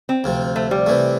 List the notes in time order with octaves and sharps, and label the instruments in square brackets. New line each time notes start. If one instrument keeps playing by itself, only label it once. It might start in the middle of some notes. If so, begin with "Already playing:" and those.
[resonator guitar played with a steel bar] C4
[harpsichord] D2 C3 F3
[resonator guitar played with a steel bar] A3
G3
[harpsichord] C3 E3 A3